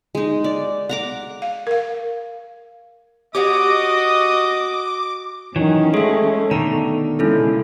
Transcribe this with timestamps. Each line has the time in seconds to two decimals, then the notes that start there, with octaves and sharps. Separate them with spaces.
0.15 G#3 D#4
0.44 D5
0.89 F#5 A#5 D6
1.42 F5
1.67 A#4 F5
3.35 F#4 G4 C#5 D#5 F#5 D6 D#6
5.56 D#3 E3 F#3 C#4
5.94 G#3 A3 G#4 E5
6.51 B2 D3 D#3 A4 A#5
7.19 C#3 G#3 A#3 C#4 E4 A4